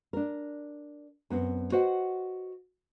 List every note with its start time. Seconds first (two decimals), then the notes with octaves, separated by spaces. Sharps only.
0.13 D4 A#4
1.30 F#2 B3 C4
1.72 F#4 B4 C5 D#5 F#5